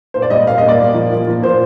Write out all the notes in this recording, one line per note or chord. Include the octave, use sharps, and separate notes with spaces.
A#2 C5
D5
G3 A#3 D#5
A#2 F5
D#5
G3
A#3 D5
A#2
F3 A#3
A#2
F3 A#3
A#2 C5